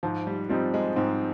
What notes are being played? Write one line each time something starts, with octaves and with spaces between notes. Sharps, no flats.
G#2 F3
G3
F3 G3 C4 D#4
G#3
G#2 C4